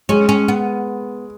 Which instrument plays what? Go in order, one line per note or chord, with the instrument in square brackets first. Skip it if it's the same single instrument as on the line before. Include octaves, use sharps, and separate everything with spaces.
[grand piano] G#3 [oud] C#4
[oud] C#4
B3